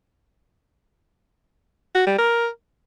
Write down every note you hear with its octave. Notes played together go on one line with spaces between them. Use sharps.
F#4
G3
A#4